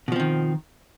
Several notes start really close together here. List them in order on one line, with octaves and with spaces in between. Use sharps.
B2 F3 C4 D#3